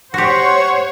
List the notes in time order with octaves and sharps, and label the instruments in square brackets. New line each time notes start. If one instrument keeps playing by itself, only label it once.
[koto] F#4 G4 [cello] C5 [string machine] C#5 [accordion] F#5 C#6